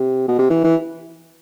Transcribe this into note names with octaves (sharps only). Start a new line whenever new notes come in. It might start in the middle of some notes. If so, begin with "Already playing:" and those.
Already playing: C3
B2
C3
E3
E3